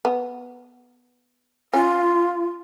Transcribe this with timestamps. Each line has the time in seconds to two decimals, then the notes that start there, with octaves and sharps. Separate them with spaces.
0.05 B3
1.73 C#4 F4